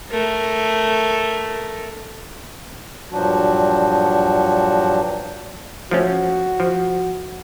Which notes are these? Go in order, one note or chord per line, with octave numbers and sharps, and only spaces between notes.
A3 A#4
G2 A#2 F3 F#3 D4 F#4
F3 A3 C#4 F#4
F3